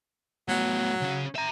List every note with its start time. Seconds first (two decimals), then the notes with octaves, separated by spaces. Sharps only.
0.49 A2 F#3 B3
1.01 C#3 C#4
1.36 E5 A#5